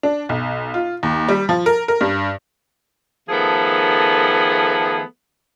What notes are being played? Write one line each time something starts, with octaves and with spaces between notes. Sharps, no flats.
D4
B1
F4
D#2
G3
F3
A#4
A#4
G2
D#3 F3 A3 B3 G#4 A4